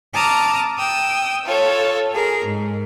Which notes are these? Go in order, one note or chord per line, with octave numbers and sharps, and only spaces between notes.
A5 A#5 D6 D#6 F6
G5 D#6 E6
F4 A4 C#5
G#4 A#4
G#2